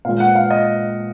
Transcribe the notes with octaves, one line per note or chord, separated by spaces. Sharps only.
A#2 G#3 F5
F#5
F5
D#5